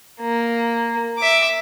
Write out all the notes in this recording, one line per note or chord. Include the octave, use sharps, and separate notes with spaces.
A#3
E5 D6